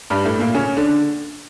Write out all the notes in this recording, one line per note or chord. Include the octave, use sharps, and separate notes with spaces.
G2 G3
A2 A3
A#2 A#3
C#3 C#4
D3 D4